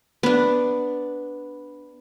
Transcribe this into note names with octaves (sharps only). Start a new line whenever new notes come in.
B3 D4